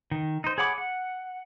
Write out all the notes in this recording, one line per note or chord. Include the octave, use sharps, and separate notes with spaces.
D#3
D#4 C5
G#4 C#5 F#5 B5 D6
F#5